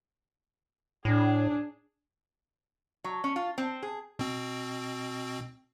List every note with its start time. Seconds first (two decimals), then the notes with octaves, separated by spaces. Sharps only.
1.05 A2 D4 G#4
3.04 F#3
3.24 C#4
3.36 F4
3.58 C4
3.83 G#4
4.19 B2 C4